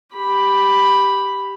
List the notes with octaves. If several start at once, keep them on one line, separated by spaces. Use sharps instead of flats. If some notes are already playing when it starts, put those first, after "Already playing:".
G4 B5